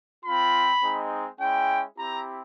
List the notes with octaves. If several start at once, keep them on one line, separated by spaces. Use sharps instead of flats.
C4 F4 B5
G#3 C4 D#4
G#3 C#4 E4 G5
C4 E4 G4 A#5